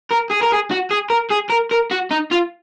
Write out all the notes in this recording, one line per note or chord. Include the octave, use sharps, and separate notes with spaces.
A#4
G#4
A#4
G#4
F#4
G#4
A#4
G#4
A#4
A#4
F#4
D#4
F4